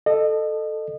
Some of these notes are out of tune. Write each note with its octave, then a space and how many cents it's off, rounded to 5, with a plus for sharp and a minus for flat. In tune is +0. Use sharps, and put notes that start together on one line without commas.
A4 +0 D#5 -30